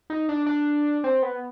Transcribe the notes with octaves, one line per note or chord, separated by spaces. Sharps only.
D#4
D4
D4
C4
B3